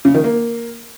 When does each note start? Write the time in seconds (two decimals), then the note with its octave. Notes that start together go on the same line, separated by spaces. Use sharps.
0.05 C#3
0.14 D#3
0.24 A#3